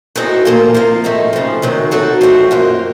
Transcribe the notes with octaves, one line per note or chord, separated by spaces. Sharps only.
A2 F#3 C4 D#4 A4
A#2 F3 A#3 F4 A#4
C3 F3 A#3 F4
A2 F3 A3 C4 D#4
C#3 F3 C4
C3 D#3 F#3 C4
D#3 F#3 C4 F#4 A4
F3 A3 C4 F#4
F#2 D#3 A#3 F4